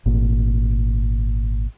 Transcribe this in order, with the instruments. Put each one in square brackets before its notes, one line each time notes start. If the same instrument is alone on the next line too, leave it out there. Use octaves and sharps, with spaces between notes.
[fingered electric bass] G#1 A#2